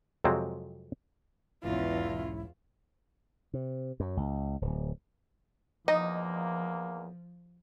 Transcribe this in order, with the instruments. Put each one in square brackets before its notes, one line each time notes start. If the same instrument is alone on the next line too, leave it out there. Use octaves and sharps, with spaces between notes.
[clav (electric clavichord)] F2 C3 F#3 G#3 C4
[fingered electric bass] B1 G#2 E3 [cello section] E2 C#4 [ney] E4 [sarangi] F4
[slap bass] C3
F#2
C#2
D1
[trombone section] E2 A#3 [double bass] F3 [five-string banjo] D#4 [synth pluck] D#5